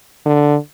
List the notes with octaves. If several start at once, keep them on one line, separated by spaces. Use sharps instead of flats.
D3